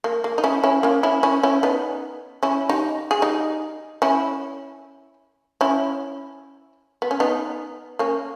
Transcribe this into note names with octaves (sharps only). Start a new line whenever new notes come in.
A#3
A#3
D#4
C#4 E4
C#4 E4
A#3 C#4
C#4 E4
C#4 E4
C#4 E4
B3 D#4
C#4 E4
D#4 G4
G#4
D#4 G4
C#4 E4
C#4 E4
B3
C#4
B3 D#4
A#3 C#4